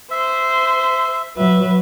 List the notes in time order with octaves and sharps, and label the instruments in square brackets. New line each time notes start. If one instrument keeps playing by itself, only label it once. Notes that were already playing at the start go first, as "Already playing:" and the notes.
[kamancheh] C5 C6 [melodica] E5
[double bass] F#3 [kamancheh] B4 E5